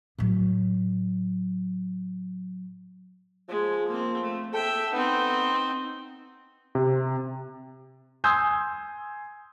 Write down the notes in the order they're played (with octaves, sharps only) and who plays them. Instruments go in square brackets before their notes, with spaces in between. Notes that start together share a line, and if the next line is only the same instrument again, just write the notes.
[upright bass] A2 F#3
[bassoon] F3 [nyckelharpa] G#3
[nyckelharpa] A#3 C4
A3
[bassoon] A4 [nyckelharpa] E5 G5
[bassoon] B3 [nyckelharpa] C4 D#4
[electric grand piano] C3
[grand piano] G#5 C6 D#6 E6 G6 G#6